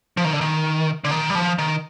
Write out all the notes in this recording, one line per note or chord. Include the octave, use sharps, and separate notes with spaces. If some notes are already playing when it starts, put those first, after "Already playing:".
F3
D#3
D3
D#3
D3
D#3
G3
F3
D#3